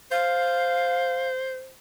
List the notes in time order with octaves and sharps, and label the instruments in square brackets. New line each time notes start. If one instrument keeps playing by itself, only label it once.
[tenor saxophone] C5 [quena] F5